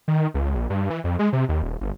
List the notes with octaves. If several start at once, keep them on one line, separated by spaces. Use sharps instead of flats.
D#3
C#2
A#1
G2
E3
F2
G#3
C3
D#2
D#1
G1